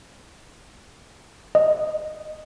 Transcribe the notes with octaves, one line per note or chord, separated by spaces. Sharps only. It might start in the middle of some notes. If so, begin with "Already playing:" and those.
D#5